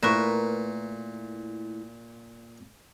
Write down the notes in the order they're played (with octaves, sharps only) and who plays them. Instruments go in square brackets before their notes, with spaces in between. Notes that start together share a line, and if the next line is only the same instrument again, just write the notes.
[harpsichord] A#2 [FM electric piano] A3 E4 [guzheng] A#4 B4 [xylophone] C#6 E7